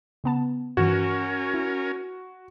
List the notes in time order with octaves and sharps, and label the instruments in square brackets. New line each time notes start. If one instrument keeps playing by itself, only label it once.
[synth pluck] C#3 B3 A5
[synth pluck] G2 D#3 E3 [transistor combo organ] C#4 A#4 G#5 [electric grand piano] F#4
[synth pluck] E4